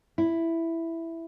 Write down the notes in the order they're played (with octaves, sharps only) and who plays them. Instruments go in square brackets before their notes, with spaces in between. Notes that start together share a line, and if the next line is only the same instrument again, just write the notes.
[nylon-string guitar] E4